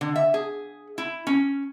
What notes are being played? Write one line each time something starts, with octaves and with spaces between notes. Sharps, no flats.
D3
E5
G#4
E4
C#4